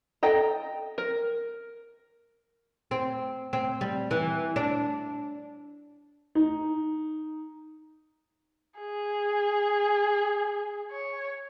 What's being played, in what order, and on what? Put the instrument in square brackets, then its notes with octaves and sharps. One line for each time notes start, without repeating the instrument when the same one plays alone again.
[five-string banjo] A4 D#5 G5 A#5
A#4
[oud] C4
C4
G3
E3
D4
[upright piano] D#4
[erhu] G#4
C#5